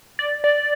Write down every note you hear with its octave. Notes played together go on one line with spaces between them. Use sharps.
D5
D5